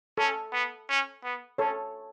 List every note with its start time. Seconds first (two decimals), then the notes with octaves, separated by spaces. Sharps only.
0.18 C#4 A4
0.52 B3
0.89 C#4
1.24 B3
1.58 C#4 A4 C#5